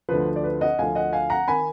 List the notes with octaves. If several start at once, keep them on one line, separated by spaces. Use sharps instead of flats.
D2 D3 F3 B4
D5
B4
D#5 F#5
D2 D3 F3 F5 G#5
D#5 F#5
F5 G#5
F#5 A#5
D#3 G#5 B5